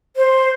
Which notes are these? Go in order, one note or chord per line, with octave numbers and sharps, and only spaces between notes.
C5